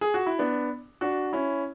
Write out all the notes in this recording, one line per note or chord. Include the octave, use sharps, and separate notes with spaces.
G#4
F#4
E4
B3 D4
D4 F#4
C#4 E4